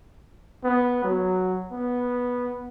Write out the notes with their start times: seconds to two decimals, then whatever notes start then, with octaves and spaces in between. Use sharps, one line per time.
0.64 B3
1.04 F#3
1.71 B3